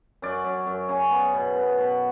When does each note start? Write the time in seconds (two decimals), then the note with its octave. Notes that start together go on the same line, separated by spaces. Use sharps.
0.22 F#2 D5
0.44 F#2
0.67 F#2
0.89 C#3
1.11 B3
1.34 B2
1.56 B3
1.78 B2